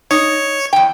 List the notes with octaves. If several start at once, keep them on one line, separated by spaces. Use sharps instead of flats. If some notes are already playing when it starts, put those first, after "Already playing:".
D#4 C#5
E2 G5